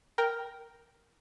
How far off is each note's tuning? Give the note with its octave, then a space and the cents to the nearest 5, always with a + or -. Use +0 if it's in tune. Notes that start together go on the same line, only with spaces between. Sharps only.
A#4 +0 G5 +0